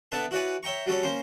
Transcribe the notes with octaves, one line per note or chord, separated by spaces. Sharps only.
D3 B3 D4 B4 E5 A5
E4 F#4 B4 C#5 D5 G#5
C#5 E5 G5 A#5 C#6
F#3 G3 C#4 A4 C#5
A#3 C#4 C5